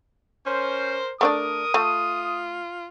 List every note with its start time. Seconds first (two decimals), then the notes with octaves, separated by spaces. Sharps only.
0.46 C#4 A#4 C5
1.21 A3 D4 A#4 D5 D#6
1.74 A3 F4